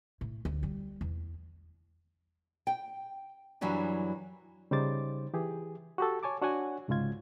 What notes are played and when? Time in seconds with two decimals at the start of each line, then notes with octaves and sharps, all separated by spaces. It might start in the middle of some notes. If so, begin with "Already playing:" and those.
0.21 A2
0.45 D2
0.63 G3
1.01 E2
2.67 G5
3.61 F#2 E3 F#3 G3 C#4 D4
4.71 C#3 G3 D#4 C5 D6 A6
5.34 E3 G4 G#4
5.98 F#4 G4 A4
6.23 C#5 G#5 A5 D6
6.42 D4 F#4 C#5 F#5 G#5
6.88 C2 G#2 C#3 G#3 F4 G#6